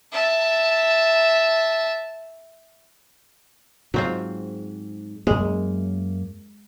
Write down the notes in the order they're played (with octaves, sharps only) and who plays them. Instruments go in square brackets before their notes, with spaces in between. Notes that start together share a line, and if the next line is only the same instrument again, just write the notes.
[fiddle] E5 A5
[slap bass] G#2 [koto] F#3 C4 F4
[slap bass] F#2 A#3 [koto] G#3